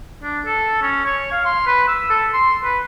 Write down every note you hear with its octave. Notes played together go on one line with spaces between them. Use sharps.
D4
A4
C#4
C#5
F5
C6
B4
E6
A4
C6
B4